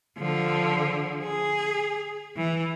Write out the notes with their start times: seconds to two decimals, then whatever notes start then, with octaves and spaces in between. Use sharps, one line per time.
0.18 D3 F3
1.22 G#4
2.37 E3